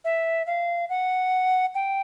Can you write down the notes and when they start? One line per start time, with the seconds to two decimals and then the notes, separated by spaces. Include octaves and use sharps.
0.05 E5
0.47 F5
0.89 F#5
1.75 G5